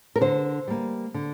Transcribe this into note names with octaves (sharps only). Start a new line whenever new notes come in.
A#4
D3 C5
G3 A#3
D3